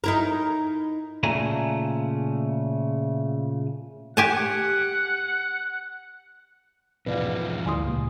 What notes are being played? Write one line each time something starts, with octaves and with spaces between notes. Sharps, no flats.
D#4 E4 A#4
A#2 C#3 A3 G#5 A#5
G4 F#5 G#5 A5
E2 G#2 B2 F3 B4 D5 F5
D2 E3 G3 G#5 C6 D#6
C#2 A#2